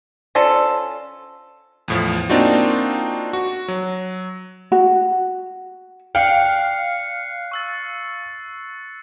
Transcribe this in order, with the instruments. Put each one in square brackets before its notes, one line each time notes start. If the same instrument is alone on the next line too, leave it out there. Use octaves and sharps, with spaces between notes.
[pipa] C#4 F4 A4 [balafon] C5 D5
[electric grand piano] E2 A2 F3
A#3 C4 D4 D#4 F4 F#4
F#4
F#3
[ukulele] F#4
[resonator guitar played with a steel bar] D5 G5 [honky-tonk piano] F5 [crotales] F#6 C7 C#7
[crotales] C#6 E6 A6